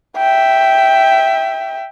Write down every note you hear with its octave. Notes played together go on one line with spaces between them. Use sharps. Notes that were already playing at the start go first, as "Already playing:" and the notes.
E5 G5